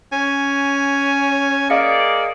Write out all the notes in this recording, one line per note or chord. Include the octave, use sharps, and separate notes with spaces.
C#4 G#5
A#3 G#4 D5 D#5 F5 C#7